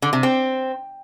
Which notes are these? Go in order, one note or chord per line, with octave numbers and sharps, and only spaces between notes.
D3
C3
C4